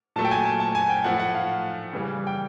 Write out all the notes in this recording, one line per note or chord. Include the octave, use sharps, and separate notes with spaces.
A#2 F#3 A3 A5
G5
G#5
A5
A5
G#5
G5
A2 F3 A3 F#5
F#5
F5
C#3 E3 G3
G5